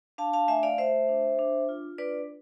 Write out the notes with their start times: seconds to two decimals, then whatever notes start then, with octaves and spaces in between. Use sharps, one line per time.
0.18 D4 F5 A5
0.33 F5 A5
0.48 A3 E5 G#5
0.63 D5 F5
0.78 A3 C5 E5
1.09 D4
1.39 D4
1.69 F4
1.98 D4 B4 D5